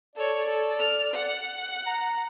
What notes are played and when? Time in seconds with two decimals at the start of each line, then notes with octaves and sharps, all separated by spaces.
0.16 A4 C#5 D5
0.47 A4
0.79 F6
1.13 F#5
1.87 A#5